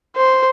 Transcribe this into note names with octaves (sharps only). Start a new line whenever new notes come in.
C5